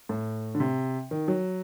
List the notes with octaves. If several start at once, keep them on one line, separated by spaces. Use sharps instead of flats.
A2
D3
C3
D#3
F#3